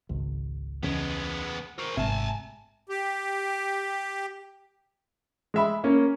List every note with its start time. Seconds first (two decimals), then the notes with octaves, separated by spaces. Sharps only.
0.09 G#1 C#2
0.83 E2 C#3 G#3 B3
1.79 A#4 C5 C#6
1.97 G#1 C3 G#3 E5 G#5 A5
2.89 G4
5.54 G#3 E5 B5
5.84 A#3 C#4